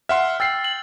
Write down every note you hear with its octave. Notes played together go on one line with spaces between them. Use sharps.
E5 F#5 C6 F6
G5 E6 A6 C7
F#7